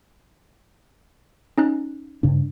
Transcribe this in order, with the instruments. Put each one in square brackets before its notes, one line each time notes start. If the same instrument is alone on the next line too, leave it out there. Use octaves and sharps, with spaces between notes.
[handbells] C#4 D#4 F#6
[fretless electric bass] G2 C#3 D4